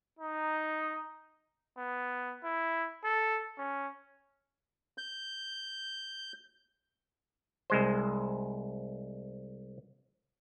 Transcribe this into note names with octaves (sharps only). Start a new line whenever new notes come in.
D#4
B3
E4
A4
C#4
G6
C2 G#3 C5